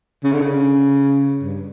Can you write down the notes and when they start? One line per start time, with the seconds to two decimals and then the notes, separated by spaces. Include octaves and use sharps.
0.24 C#3
0.32 D3
0.41 C#3
1.43 G2